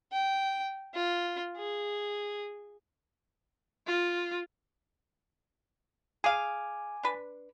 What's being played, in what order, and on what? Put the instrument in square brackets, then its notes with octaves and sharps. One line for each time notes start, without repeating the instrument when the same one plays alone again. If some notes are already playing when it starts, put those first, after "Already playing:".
[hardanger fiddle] G5
F4
G#4
[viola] F4
[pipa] G#4 F5 [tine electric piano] G#5 D6
[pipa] D4 B4